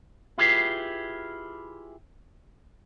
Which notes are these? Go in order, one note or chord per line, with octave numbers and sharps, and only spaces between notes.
E4 F4 G4 G#4 B4